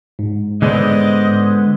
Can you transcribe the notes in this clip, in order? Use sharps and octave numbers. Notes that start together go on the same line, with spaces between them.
G#2
D3 G#3 B3 C5 D5 D#5